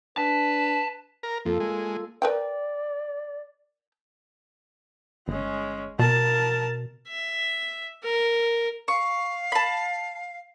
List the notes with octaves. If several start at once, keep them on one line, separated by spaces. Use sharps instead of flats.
D4 B4 A5
A#4
F2 A#3 F4 A4
G#3
A#4 B4 D5 G5
G1 G#3 C#4
B2 A#4 A5
E5
A#4
F5 C#6
A5 B5